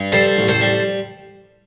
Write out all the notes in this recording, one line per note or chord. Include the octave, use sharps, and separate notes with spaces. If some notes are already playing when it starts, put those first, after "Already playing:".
Already playing: G2
G3 A4 C5
A1
A4 C5
G3